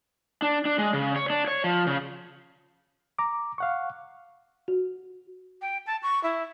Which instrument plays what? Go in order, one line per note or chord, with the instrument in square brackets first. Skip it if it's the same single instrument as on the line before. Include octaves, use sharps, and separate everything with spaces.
[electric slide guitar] D4
D4
G#3
C#3
C#5
D4
C#5
F3
C#3
[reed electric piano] A#5 D6
F5 F#5 C#6
[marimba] F#4
[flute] G5
A5
C#6
E4